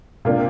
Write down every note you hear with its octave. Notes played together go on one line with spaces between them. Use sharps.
C3 A#3 D4 F4